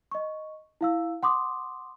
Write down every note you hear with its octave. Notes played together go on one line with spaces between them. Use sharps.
D#5 C#6
E4 F5 E6
F#5 C6 D6 D#6